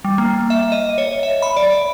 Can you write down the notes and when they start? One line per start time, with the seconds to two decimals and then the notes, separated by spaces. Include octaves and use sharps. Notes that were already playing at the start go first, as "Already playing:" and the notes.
0.04 G3
0.18 A#3
0.50 E5
0.72 D#5
0.98 C#5
1.23 E5
1.42 B5
1.57 D5